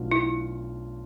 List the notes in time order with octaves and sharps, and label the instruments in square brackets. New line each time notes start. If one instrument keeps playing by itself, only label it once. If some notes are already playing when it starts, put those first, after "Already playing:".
Already playing: [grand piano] B1 B2 A3 D4 F4
[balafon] E4